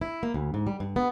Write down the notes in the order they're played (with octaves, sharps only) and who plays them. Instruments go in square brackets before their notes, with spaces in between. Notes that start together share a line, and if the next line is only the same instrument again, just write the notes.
[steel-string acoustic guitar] E4
A#3
D2
G#2
G3
G2
B3